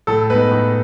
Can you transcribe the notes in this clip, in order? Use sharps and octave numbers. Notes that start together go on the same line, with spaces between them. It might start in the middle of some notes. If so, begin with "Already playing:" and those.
A2 A4
G#3 B3 D#4 B4
A2